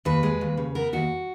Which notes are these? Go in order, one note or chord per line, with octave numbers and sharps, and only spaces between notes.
D#2 B4
G#3
D#2
C#3
B3 A#4
D#2 F#4